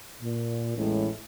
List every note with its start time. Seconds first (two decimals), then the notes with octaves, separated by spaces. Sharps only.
0.22 A#2
0.76 A1 E2 A2 G#3 C#4 E4